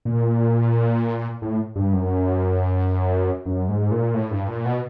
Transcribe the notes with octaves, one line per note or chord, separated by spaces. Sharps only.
A#2
A2
G2
F#2
F#2
G#2
A#2
A2
G2
A#2
B2